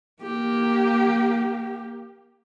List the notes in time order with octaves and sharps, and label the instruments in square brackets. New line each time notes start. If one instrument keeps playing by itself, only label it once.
[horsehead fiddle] A#3 G4